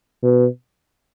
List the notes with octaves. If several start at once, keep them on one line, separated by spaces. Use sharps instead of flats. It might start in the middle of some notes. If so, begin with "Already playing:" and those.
B2